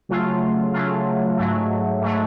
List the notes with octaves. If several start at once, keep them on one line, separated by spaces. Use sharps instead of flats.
C#3 F#3 A3 F4
C#3 F#3 A3 F4
G#2 F#3 A3
G#2 F#3 A3